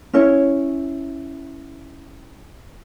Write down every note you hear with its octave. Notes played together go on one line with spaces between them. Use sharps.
C#4 E4 C#5